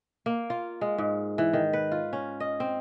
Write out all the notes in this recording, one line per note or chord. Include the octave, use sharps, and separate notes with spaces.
A#3
F4
G#3
G#2
E3
D#3
B4
F4
C#4
D#5
C4